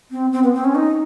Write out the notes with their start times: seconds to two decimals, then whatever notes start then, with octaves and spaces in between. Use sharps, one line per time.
0.11 C4
0.32 C4
0.43 B3
0.54 C4
0.64 C#4
0.75 D#4